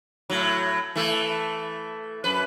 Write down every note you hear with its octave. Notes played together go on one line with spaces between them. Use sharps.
A2 F#3
E3 A3 A4
F#2 B4